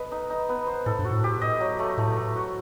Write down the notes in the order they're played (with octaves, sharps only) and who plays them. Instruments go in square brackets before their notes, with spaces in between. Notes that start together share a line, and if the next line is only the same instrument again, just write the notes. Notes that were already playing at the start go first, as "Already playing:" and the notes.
Already playing: [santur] B3 A4 B4 D#5
D#4
D#4
B3
C5
[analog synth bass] A2 [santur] A4
[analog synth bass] G2
[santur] F#4
[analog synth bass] A2
[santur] G4
D#5
F#3
A3
[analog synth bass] A2 [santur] A3
[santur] A3
F#4